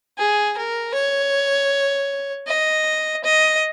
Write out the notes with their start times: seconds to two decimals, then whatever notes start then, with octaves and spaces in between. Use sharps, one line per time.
0.18 G#4
0.57 A#4
0.94 C#5
2.47 D#5
3.24 D#5